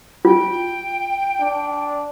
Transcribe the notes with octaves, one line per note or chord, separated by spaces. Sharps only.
F4 G5
D4